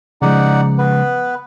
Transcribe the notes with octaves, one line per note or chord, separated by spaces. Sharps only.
C#3 F3 G#3 D#4 D5 F#5
B3 B4